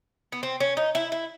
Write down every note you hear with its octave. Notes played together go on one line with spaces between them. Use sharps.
B3
C4
C#4
D#4
E4
E4